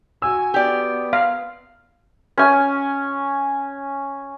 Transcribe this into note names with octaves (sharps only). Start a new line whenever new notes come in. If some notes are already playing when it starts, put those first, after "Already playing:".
F#4 G#5 E6
B3 G4 D5
F5
C#4 G#5